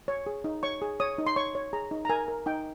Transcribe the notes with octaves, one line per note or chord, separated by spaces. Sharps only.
C#5
G#4
D#4
C#5 C#6
G#4
C#5 D#6
D#4
C6
C#5 C#6
C#5
G#4 A#5
D#4
A#5
A#4 G#5
A#4
D#4 G5